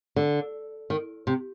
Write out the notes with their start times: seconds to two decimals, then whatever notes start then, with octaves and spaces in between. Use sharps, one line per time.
0.16 D3
0.90 D#3
1.27 C3